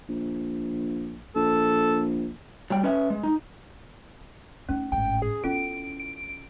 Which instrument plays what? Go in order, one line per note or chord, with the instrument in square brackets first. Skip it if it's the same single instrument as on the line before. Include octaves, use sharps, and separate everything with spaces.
[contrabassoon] A#1
[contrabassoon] A#1 [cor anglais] A4
[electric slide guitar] F#3 G3 G5
C#4 B4 D#5 E5
G#3
D#4
[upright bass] A3 D#4 [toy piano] C#4
[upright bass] G#1 A2 [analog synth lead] G5
[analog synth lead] G#4
[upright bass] B3 E4 [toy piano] C#4 F4 A4 [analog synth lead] D7
[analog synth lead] D7